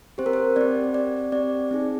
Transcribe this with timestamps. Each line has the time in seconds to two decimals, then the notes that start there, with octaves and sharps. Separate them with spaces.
0.18 C4 G4 C5
0.26 A#4
0.33 C5
0.56 C4 G4 D5
0.94 C4 G4 D5
1.32 C4 G4 D5
1.71 C4 D#4 G#4